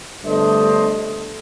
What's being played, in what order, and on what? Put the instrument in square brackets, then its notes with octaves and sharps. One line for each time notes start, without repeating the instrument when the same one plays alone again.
[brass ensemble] G1 G2 A3 D4 C5 D#5